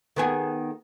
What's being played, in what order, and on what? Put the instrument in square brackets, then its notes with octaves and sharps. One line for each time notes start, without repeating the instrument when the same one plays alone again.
[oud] D#3 B3 G#4